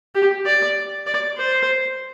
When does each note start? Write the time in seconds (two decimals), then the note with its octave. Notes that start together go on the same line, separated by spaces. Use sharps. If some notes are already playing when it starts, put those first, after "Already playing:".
0.15 G4
0.46 D5
1.07 D5
1.38 C5